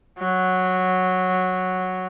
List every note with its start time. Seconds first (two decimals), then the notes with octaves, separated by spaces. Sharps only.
0.19 F#3